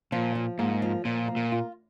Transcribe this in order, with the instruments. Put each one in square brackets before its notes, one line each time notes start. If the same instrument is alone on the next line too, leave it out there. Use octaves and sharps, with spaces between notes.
[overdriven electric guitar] A#2 [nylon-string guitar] F3
[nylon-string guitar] F3
[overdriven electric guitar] G#2 [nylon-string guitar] A#3
[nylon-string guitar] F3
[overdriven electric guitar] A#2 [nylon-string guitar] F3
[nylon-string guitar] A#3
[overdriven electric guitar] A#2
[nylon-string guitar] F4